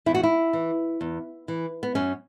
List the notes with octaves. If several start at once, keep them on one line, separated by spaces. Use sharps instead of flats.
E2 E4
F#4
E4
E3
E2
E3
B3
F#2 C#4